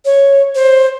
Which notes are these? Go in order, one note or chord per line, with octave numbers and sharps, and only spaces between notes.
C#5
C5